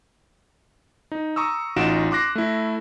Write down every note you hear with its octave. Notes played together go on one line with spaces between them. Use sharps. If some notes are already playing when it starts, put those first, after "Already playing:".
D#4
A#5 C#6 D#6 E6
A1 D#4 F4 F#4 D7 E7
C6 D6 F#6 A#6 C7
A3 E4